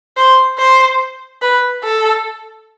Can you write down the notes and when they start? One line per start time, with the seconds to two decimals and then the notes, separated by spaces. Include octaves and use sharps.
0.17 C5
0.58 C5
1.42 B4
1.84 A4